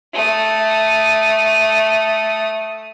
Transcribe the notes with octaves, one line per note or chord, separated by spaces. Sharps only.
A3 D#6